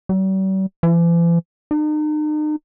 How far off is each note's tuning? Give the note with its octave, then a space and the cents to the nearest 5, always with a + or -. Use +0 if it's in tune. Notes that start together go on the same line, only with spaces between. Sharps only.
G3 -45
E3 +45
D#4 -40